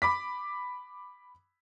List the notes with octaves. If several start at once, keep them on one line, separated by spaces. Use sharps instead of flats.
B5 D6 B6